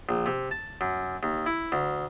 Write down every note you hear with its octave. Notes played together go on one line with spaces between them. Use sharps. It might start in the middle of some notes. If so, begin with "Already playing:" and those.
A#1
C3
A5
F#2
D#2
E4
D2